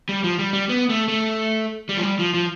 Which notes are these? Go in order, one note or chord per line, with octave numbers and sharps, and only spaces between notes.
G3
F3
G3
G3
B3
A3
A3
G3
F3
G3
F3
F3